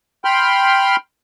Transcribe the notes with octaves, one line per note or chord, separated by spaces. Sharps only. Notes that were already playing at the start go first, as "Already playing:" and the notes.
G5 B5 C6 F6